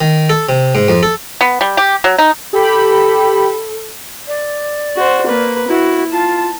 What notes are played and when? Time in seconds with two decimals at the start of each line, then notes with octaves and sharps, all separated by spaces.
0.01 D#3
0.30 A4
0.49 C3
0.75 G#2
0.89 F2
1.03 A4
1.41 B3
1.61 G3
1.77 G4
2.04 F#3
2.18 D#4
2.53 G4 A4 B5
4.28 D5
4.97 F#4 C5
5.27 A#3 B4
5.68 E4 F#4
6.12 F4 A5